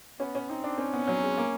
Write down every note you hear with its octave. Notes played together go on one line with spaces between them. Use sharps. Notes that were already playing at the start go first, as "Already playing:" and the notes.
B3 C#4
C#4
C4 D#4
D4
C4 C#4
B3
F#3
G#3
A#3